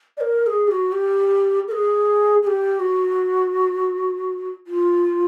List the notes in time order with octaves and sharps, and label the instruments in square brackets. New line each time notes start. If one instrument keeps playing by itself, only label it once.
[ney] D5
A#4
A#4
G#4
G4
F#4
G4
A#4
G#4
G#4
G4
F#4
F4